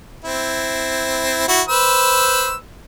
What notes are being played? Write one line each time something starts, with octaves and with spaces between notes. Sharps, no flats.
C4 E4
E4 F#4
B4 C5 E6